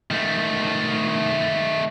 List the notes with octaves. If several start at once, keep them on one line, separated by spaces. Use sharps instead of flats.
D#3 A3